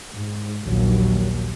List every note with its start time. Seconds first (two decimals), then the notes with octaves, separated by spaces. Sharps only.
0.11 G#2
0.65 A#1 D#2 F#3